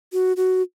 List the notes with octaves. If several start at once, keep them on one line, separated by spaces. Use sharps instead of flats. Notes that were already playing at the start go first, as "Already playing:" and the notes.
F#4
F#4